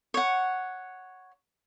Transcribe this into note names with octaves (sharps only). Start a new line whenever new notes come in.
C#5 F#5